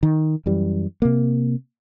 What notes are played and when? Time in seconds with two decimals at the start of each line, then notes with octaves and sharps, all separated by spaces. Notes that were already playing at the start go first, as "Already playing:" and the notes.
0.03 D#3
0.46 F#2 E3 G3
1.02 C3 A#3